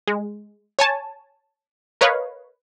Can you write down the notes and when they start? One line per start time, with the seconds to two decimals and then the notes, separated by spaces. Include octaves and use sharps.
0.08 G#3
0.79 C#5 G#5 A5
2.01 A#4 B4 C#5 D#5 F5